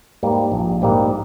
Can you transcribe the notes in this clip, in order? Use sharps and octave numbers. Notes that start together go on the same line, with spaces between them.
G#2 G3 A#3
A#1
G#2 G3 A#3